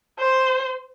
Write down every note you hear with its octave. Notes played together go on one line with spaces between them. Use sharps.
C5